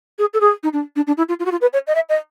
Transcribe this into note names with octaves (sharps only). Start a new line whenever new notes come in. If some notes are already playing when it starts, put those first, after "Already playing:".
G#4
A4
G#4
D#4
D4
D4
D4
E4
F4
F4
F#4
F4
B4
C#5
D#5
E5
D#5